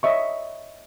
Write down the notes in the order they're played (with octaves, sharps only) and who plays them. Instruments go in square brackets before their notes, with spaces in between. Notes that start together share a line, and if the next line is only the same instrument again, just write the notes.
[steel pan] C#5 D#5 E5 C#6